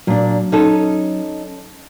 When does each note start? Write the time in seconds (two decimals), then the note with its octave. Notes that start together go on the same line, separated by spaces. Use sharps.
0.07 A#2 F#3 D4
0.52 C#4 D#4 A4